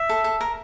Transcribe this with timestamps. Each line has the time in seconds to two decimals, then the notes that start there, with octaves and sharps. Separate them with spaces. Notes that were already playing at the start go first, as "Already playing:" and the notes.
Already playing: E5
0.09 A4
0.24 A4
0.41 A#4